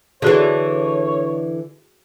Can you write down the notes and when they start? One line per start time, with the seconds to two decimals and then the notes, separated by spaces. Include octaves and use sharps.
0.22 D3 E3 F#4 G#4 C#5